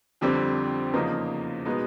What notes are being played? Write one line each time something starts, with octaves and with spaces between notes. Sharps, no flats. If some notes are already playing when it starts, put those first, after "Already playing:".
F2 D3 G3 C4
E2 C#3 F3 A#3 D#4
B2 G#3 B3 D#4